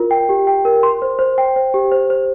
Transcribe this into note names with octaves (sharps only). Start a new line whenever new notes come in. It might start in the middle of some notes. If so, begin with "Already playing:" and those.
Already playing: F4 A#4
G5
G4
G5
A#4
C6
C5
C5
G5
C5
G4
C5
C5